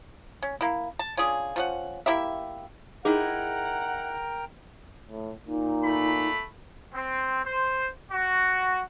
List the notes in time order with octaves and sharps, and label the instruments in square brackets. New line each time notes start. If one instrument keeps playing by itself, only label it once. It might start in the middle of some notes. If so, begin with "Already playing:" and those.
[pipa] C#4
A#3 E4
A5
C#4 D4 F4 G#4
F3 C#4 F#5
A#3 E4 G4 E5
[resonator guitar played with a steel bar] D#4 E4 [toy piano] G#4 [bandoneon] A#4 G5 A#5 [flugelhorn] F#5
[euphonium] A2
[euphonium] A#2 [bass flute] D#4
[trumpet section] A3 B5
C4
C5
F#4